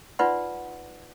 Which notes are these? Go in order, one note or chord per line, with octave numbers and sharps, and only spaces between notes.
D#4 F4 B4 D5 F#5 C6